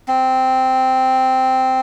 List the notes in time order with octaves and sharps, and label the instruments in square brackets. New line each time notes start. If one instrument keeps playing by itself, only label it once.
[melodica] C4